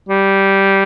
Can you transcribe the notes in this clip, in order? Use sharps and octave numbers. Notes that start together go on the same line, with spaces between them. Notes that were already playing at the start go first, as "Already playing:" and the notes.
G3